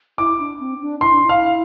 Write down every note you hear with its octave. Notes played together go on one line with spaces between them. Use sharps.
E4 D6
D4
C4
D4
E4 C6
D4
E4 F5